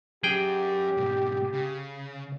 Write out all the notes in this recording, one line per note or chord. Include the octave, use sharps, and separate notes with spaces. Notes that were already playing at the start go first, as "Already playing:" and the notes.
F#3 C#4 G4 G#4 G5
G#2 B2
C#3